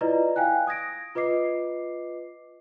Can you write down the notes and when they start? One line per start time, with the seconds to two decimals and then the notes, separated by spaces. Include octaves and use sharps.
0.01 E4 F4 B4 D5 D#5 A#5
0.36 F5 G5 G#5 F#6
0.67 D#6 G#6 A#6 D7
1.15 F4 B4 D#5 D6 C7